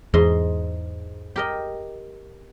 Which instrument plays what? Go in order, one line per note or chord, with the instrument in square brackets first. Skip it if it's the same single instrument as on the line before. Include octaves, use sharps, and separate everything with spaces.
[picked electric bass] E2 [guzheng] G#2 D#5 C6
[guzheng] G4 A#4 D#5